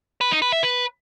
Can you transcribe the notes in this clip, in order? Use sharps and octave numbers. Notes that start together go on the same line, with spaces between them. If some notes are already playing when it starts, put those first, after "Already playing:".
B4
D#4
B4
E5
B4